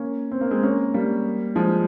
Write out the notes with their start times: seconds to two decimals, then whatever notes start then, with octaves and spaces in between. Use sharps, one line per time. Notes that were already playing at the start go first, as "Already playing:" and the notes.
Already playing: A#3 C#4
0.31 C4
0.41 A#3
0.51 G#3 C4
0.63 A#3 C#4
0.94 G3 A#3
1.55 F3 G#3